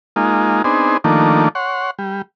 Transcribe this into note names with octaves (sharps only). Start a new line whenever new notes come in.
G#3 A#3 D#4 F4
B3 C4 D4 D#4 G#4 C5
D#3 F3 A3 A#3 D4
C#5 F#5 C6
G3